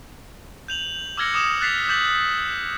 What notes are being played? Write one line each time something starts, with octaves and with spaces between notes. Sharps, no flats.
G6 F7 F#7
D6 E6 F6 G#6 A#6 C#7
D6 D#6 E7
F#6 A6 B6 C7 F7
D6 G6 A6 B6 F#7